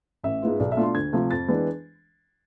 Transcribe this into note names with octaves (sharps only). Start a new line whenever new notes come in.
A1 E5
G#2 G#3 B3 F4
B1 D5
E5
B2 A3 D4 F4
C6
D2 G#6
C3 F3 A3
F2 A6
E3 G#3 B3 D4